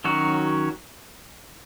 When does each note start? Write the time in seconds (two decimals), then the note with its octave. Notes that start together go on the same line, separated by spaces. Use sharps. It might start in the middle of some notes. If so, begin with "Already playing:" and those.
0.04 D#3 F#3 C#4 F#4